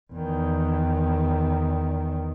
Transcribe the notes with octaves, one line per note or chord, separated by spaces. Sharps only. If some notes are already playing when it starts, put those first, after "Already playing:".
E2 D#3